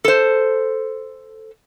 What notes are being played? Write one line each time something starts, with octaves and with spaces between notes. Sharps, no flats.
A4 C5